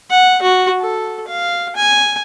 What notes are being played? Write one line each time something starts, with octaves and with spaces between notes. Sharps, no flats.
F#5
F#4
A4
F5
G#5